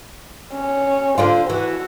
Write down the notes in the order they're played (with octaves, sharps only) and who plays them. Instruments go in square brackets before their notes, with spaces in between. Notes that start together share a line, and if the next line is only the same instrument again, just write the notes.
[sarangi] C#4
[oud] D3 D4 F4 [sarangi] C5
[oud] E3 [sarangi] F#4